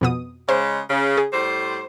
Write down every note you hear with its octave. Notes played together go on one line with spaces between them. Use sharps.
F2 B2 D#6
C#3 G#3 C5
C#3
G#4
A2 G3 C5